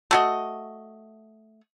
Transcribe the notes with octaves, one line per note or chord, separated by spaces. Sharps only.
A3 F#4 D#5